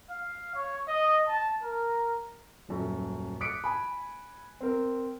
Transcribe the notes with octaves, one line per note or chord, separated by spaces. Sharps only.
F5
C#5
D#5
A5
A#4
D#1 F#2 A3
D6 D#6 F#6 B6 C#7 D7
G#5 B5
C4 A#4